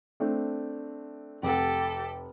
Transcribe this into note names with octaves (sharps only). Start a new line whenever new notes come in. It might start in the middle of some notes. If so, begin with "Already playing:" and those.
A3 C4 D4
F1 G4 A4 F#5